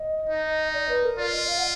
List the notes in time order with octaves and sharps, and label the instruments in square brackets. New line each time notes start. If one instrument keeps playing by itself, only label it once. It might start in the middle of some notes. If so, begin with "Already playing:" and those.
Already playing: [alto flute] D#5
[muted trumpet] D#4
[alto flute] D5
B4
A#4
[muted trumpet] F4 [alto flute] D5
[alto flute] D#5
F5
F#5